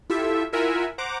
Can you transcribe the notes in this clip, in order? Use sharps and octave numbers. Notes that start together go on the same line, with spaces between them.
E4 F4 G4 A4 E5
E4 F4 A#4 E5 F#5 G#5
C5 F#5 A#5 D6